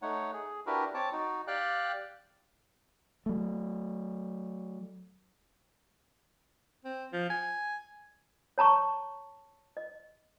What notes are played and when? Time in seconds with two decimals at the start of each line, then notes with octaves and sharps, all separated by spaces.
0.02 A3 D#4 C#5 F#5
0.33 G#4
0.66 D4 E4 F#4 G4 A#4 B4
0.94 C4 C#5 A5 D6
1.12 D#4 F#4
1.47 G4 D5 F5 G5 F#6
3.26 F#3 A3
6.85 C4
7.13 F3
7.30 G#5
8.58 C#5 A5 A#5 C#6
9.77 D#5